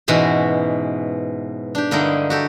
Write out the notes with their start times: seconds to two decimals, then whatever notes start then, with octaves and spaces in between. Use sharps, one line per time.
0.08 G#2 B2 E3 C#4 F#4 E5
1.75 D4 G4
1.91 G2 D3 A#3 D#4 E4 D#5
2.30 F#4 G4 A4